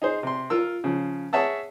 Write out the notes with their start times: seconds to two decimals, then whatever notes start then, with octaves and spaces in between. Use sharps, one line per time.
0.02 D#4 G#4 C5
0.23 C3 C6
0.50 F4 A#4 E6
0.84 C#3 F3
1.33 G#4 C#5 E5 F#5 A5 E6